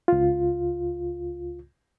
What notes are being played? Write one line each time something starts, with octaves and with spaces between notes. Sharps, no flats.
C#2 F4